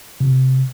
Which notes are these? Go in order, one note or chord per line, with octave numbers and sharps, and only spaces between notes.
C3